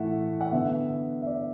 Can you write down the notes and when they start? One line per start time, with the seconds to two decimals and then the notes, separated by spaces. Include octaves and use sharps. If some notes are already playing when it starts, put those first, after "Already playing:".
Already playing: A2 E3 A3 E5 F#5
0.41 F#5
0.52 D3 B3 E5
1.22 E5
1.27 D5